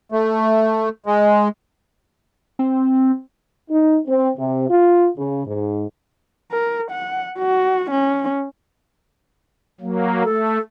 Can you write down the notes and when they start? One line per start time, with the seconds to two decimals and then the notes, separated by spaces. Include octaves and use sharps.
0.12 A3
1.06 G#3
2.59 C4
3.71 D#4
4.08 C4
4.38 C3
4.70 F4
5.18 C#3
5.47 G#2
6.52 A#4
6.91 F#5
7.39 F#4
7.91 C#4
9.81 F#3 A#3
10.24 A3 A4